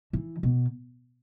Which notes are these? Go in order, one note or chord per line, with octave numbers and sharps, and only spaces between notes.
E3
B2